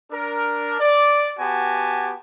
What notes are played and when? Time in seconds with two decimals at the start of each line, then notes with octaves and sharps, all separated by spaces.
0.11 D4 A#4
0.80 D5
1.39 B3 F#4 G4 G#5 A5